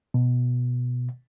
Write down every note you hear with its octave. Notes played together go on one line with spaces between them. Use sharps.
B2